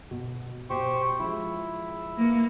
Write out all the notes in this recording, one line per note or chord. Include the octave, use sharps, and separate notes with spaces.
B2
B2 G4 C5 C#6
F3 G#3 E4
A#3 B4 C#7